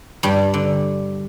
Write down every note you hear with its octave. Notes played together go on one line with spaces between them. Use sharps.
G2 G3
D3